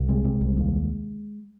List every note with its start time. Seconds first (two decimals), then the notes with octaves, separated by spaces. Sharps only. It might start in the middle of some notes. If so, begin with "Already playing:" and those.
Already playing: C2
0.08 C3 G#3
0.24 C3
0.41 C2
0.57 D#2